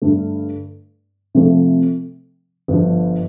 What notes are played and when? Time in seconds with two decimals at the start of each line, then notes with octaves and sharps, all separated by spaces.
0.02 G2 D3 A3
1.35 C3 F3 A3
2.68 G1 G2 F3